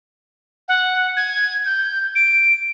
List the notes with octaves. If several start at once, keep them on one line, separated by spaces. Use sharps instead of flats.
F#5
G#6
G6
D7